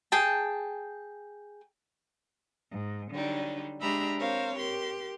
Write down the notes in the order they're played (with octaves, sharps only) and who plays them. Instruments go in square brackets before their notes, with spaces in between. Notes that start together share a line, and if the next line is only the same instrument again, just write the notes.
[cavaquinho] G#4 G5 A5
[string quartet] G#2
D3 F#3 G3 D#4
G#3 D4 G4 E5 A#5 B5
C4 A#4 C5 C#5 F5
G4 A#4 C6